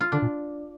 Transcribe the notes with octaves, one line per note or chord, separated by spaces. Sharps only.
F4
D3 D4
A#2